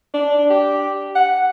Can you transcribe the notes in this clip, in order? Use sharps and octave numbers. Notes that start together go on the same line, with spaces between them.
D4
G4
F#5